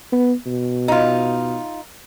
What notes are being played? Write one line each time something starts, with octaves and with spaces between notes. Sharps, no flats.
B3
B2
D#4 F4